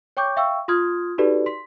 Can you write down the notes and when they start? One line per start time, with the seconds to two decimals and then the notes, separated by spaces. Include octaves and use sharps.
0.17 C#5 G5 C#6 D6 G6
0.36 E5 F5 G5 C#6 E6
0.68 F4 C6 D#6 F6 G#6
1.18 D#4 F#4 G4 A4 B4 D5
1.46 C6 B6